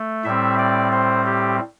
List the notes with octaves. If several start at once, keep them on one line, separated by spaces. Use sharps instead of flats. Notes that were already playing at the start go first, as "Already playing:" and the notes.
Already playing: A3
A2 G3 C4 E5
D5
C5
G4